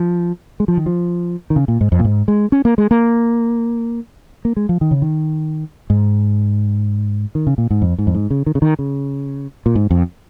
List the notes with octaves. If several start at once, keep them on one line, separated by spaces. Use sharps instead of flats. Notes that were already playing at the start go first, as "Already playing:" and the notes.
Already playing: F3
G#3
F3
D#3
F3
D#3
C#3
A#2
G#2
F2
A#2
G#2
G#3
C#4
A#3
G#3
A#3
A#3
G#3
F3
D#3
C#3
D#3
G#2
D#3
C#3
A#2
G#2
F2
G#2
F2
G#2
C#3
D#3
C#3
D#3
C#3
A#2
G#2
F2